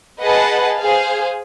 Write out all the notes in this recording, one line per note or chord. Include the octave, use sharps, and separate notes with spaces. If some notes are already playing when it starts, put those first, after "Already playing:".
G#4 B4 D#5 F#5 A5
G#4 C5 F5